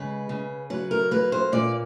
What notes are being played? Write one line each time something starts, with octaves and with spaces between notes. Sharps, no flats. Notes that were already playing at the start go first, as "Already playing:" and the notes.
Already playing: C#3 G#3 B4
C#3
F#3 B4
A#4
A#3 B4
C5
A#2 D5